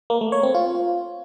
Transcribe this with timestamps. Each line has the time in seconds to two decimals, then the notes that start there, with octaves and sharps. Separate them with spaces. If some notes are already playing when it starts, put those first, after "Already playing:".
0.10 A#3
0.21 A3
0.32 C#5
0.43 C4
0.55 F4